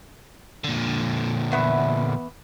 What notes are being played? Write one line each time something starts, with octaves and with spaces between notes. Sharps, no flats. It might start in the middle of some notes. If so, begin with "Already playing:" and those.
A#2 D3
E2 B3 E5